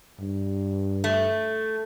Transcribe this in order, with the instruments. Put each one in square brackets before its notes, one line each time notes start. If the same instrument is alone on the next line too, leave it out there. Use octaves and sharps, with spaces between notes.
[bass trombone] G2
[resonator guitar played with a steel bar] A3